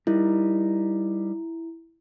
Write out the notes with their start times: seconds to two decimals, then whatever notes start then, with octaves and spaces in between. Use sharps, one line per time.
0.07 G3 D#4 E4 A#4